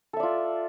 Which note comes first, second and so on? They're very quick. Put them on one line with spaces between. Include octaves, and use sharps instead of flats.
A4 E5 D5 F4